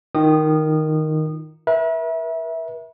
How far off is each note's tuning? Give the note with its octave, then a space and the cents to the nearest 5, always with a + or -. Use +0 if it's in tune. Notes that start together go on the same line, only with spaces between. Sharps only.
D#3 +0 F4 -15 D#6 -25
B4 -45 E5 -10